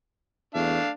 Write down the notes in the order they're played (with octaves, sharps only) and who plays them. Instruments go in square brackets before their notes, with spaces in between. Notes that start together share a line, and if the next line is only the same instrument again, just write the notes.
[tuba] E2 [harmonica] A3 D4 F5